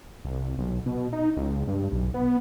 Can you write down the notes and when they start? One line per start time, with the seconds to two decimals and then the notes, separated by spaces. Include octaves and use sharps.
0.25 C2
0.59 B1
0.86 B2
1.13 D#4
1.37 C#2
1.68 G2
1.92 B1
2.14 B3